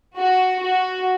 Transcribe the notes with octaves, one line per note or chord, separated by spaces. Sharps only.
F#4
F#4